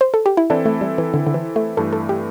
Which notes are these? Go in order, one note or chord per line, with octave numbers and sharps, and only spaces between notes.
C5
A4
G4
E4
E3 C4 D4 E4 A4
A3
G3
E3
D3
D3
E3
A3
G2 E3 A3 A4
A4
G4